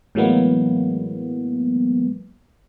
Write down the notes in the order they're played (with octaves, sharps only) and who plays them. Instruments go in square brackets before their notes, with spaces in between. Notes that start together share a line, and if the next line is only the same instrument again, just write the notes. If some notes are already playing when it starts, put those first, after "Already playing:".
[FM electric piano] A2 E3 F#3 G#3 A#3 B3